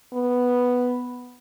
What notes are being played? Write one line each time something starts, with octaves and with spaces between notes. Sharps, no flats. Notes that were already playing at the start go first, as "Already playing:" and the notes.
B3